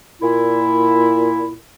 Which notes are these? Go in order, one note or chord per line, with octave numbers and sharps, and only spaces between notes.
A#2 E4